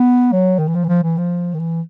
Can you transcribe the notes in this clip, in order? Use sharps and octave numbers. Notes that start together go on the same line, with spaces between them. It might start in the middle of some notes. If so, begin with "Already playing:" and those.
Already playing: B3
F#3
D#3
E3
F3
E3
F3
E3
F3
D#3
E3